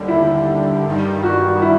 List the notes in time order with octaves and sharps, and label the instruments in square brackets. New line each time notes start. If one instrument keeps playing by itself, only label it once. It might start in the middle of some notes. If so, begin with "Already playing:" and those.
Already playing: [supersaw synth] D#2 D3 G3
[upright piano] E4
[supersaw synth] G2 D#3 G3
[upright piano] F#4
E4